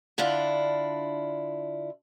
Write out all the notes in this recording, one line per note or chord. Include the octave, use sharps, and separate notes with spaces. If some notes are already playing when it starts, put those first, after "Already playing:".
D3 D4 E4 F4 D5